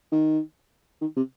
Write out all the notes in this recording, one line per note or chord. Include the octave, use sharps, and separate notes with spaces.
D#3
D#3
C3